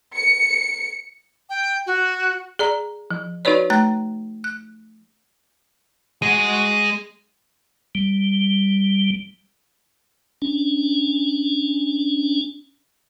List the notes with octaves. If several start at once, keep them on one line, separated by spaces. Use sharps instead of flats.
C#7
G5
F#4
G#4 D5 A#5
F3
D#4 F#4 B4 C#5 D5
A3 A#5 F#6
F#6
G#3 F#4 G#4 D#7
G3
C#4 D4